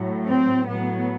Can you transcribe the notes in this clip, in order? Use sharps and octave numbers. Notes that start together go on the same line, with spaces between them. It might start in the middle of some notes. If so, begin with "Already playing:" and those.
Already playing: A2 F#3
C4
A2 F#3 B3